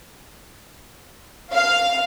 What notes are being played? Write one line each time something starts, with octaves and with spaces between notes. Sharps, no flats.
F5